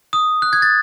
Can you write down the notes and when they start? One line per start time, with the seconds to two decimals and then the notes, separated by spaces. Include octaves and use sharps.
0.13 D#6
0.42 F#6
0.53 G#6
0.62 A6